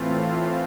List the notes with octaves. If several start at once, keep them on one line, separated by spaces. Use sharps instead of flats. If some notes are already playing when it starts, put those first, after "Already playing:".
Already playing: A2 E3 A3 C4 F4